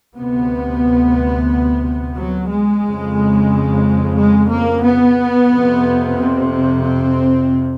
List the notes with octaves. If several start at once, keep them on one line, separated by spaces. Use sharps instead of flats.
D2 C3 B3
F#3
G#3
F2 C#3
G#3
A#3
B3
F2 C3
C4
C4
C4